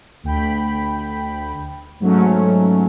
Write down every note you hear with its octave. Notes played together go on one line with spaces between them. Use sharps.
D2 G5 B5
G#2 F#3 A3 C#4